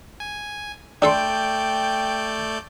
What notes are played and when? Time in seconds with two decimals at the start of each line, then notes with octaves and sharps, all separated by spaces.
0.20 G#5
1.02 A3 D4 A4 D5 G5 C6 G6